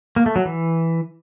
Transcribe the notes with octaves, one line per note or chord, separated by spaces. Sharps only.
A#3
A3
F#3
E3